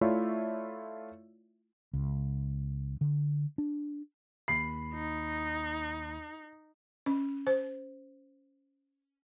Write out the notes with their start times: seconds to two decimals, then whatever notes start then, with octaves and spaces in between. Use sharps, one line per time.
0.01 A3 E4 F4 C#5 D5 E5
1.93 C#2
3.01 D3
3.58 D4
4.48 D#2 B5 C7
4.94 D#4
7.06 C#4
7.47 C5